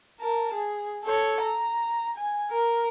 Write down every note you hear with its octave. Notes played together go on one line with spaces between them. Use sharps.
A#4 A5
G#4
A4 C#5
A#5
G#5
A#4